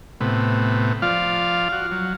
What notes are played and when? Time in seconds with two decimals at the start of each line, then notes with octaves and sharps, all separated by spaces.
0.21 A2 C3 B3
1.02 F3 F4 D5 F5
1.72 F#4
1.91 F#3